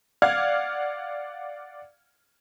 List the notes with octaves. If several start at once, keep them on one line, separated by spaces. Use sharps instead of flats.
D5 F5 F#5 F6 G#6